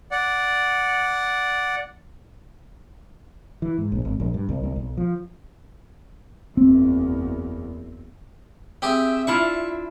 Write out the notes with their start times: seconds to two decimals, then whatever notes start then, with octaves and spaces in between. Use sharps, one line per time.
0.11 D5 F#5
3.62 E3
3.78 G#2
3.92 A#1
4.05 G#1
4.20 A#1
4.34 G2
4.49 C2
4.63 C2
4.76 B1
4.97 F3
6.57 F#1 E2 C4
8.82 C4 G4 G#4 E5
9.27 D4 E4 F4 C#6